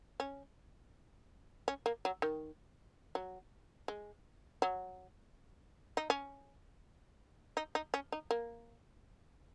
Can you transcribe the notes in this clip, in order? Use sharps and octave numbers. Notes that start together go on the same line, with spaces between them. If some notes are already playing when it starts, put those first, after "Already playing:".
C#4
C#4
A#3
F#3
D#3
F#3
G#3
F#3
D#4
C#4
D#4
D#4
C#4
D#4
A#3